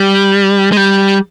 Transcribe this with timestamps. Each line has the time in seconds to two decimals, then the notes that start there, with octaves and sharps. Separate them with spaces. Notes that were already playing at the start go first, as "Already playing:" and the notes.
Already playing: G3
0.72 G#3
0.77 G3